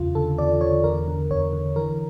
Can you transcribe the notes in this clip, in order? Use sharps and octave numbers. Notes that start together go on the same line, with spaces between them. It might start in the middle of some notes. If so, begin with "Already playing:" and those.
Already playing: E2 C#3 F4
D3 A4
E2 D5
D3 C#5
E2 A#4
D3
E2 C#5
D3
E3 A#4